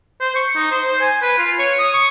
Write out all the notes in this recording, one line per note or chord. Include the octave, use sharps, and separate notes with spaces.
C5
C#6
D#4
C5
C5
G#5
B4
F4
C#5
D#6
C#6